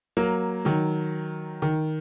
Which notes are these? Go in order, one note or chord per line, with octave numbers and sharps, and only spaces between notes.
F#3 A#3
D#3 F#3
D#3